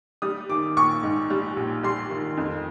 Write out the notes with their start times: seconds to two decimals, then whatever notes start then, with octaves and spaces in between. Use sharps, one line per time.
0.22 G3 D#6
0.49 D#3 D6
0.77 A#1 C#6
1.03 G#2
1.30 G3
1.57 A#1
1.83 G3 C6
2.10 D#3
2.37 F2